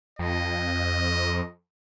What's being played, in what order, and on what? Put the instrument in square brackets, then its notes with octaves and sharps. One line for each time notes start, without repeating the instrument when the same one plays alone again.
[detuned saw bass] F2 [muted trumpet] D#5